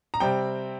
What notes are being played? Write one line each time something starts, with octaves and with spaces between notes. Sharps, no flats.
A#5
C3 G3 C4 G5